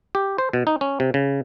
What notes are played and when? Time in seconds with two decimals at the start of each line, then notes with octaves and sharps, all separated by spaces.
0.15 G4
0.38 C5
0.53 B2
0.67 D#4
0.81 C#4
1.00 C3
1.14 C#3